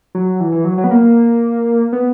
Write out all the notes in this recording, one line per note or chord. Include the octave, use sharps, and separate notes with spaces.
F#3
E3
E3
F#3
F#3
B3
A#3
B3